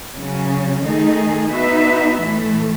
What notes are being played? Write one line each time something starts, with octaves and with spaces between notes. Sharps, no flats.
C#3 F#3 C#4
D#3 A3 D#4 G#4
B3 D#4 F#4 B4 E5
A2 E3 A3